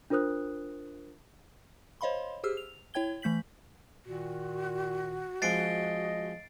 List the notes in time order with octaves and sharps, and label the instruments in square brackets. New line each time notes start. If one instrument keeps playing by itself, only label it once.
[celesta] D4 F4 A#4 C5 D#6 F#6
[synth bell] C5 C#5 D#5 F5 B5 C6
G4 G#4 C5 E6 F6
F7
E4 C#5 G5 G#6 G7
E3 A3 G6 B6 F#7
[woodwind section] A#2 D#3 [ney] F#4
[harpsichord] F3 G#3 C4 [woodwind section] D#5 [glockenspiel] A6 C7 D7